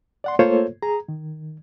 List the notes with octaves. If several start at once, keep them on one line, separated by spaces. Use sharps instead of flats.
D5 F#5 C6
A3 A#3 F4 A4 C5 C#5
G#4 A#5
D#3